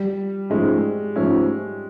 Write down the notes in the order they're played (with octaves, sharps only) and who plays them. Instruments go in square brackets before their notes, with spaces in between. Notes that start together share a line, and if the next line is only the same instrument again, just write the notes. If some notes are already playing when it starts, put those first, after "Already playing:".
Already playing: [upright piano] G3
[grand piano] G#2 F3 A3 C#4 [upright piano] G#3
[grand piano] G#2 F3 A3 C#4